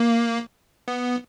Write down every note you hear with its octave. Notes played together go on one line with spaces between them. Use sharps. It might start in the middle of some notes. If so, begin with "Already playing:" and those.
Already playing: A#3
B3